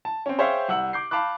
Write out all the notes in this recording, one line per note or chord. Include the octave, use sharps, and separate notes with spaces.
A5
C4 C#4
G#4 C5 C#5 E5 F5 G5
C2 F#5 E6 F#7
D6 G6 C7
F5 A5 B5 D6 F#6